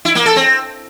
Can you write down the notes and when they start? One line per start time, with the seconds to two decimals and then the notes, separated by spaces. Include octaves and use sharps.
0.05 E4
0.15 A#3
0.26 A4
0.36 C4